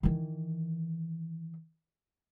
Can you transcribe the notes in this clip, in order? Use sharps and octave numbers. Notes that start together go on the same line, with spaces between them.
D#3 E3